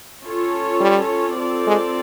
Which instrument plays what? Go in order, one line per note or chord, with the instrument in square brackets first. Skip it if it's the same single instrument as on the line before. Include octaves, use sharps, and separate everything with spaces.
[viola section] C#4 F4 A4 C#5
[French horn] G3
[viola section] C4 F4 A4 D5
[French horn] G#3